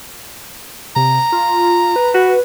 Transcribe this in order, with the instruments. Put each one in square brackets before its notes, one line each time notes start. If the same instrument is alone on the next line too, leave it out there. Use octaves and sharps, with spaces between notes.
[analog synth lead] C3 [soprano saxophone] A#5
[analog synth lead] F4
B4
[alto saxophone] F#4 [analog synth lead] B4